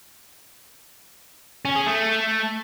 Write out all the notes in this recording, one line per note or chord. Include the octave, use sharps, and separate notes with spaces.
C#4
G#4
A3